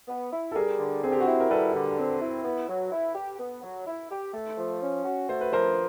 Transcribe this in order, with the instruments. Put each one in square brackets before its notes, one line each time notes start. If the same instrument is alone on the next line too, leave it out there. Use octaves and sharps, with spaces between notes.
[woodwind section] B3
E4
[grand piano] A4
[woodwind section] G3 [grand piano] G#4 A#4
[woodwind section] D3
[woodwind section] C4 [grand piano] G#4
[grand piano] G4
F#4 G#4
[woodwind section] E4
[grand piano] A#4
[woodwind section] G3 [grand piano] A4 B4
[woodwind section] D3
C4
E4
B3
F#3
E4
G4
B3
F#3
E4
G4
A3
F3
C#4
F#4
[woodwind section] A3 [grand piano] C5
[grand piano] B4
[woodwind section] F3 [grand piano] A#4 C5